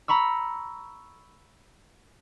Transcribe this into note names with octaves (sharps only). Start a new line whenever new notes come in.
A#5 B5 C#6 E6